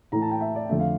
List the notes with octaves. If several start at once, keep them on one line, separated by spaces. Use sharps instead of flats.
A2 E3 A3 A#5
A5
G5
E5
D5
F2 D3 A3 E5
F5